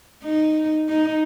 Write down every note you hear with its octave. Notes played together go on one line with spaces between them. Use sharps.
D#4
D#4